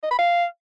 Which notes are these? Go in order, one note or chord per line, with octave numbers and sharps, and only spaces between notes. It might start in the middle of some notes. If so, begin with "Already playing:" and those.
D#5
B5
F5